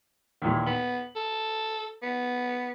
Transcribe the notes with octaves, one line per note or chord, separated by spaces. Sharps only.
D#2 A#2 E3
B3 F#7
A4
B3